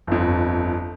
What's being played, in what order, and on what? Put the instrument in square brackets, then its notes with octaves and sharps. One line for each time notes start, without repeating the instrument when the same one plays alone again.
[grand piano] G1 F2